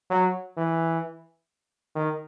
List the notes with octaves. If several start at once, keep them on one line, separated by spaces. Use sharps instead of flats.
F#3
E3
D#3